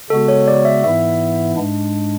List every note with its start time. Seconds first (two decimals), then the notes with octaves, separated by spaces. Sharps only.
0.10 C#3 G#3 B3 F#4 A4
0.28 C#5
0.48 D5
0.65 E5
0.83 G#2 E3 B3 E4 E5
1.57 G#2 G#3 D4